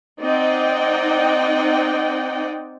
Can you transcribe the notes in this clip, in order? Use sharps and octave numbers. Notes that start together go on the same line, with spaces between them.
C4 D#4 D5 D#5 F#5 G5